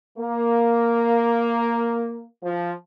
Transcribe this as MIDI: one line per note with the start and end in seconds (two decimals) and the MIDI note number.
0.18 2.25 58
2.43 2.71 53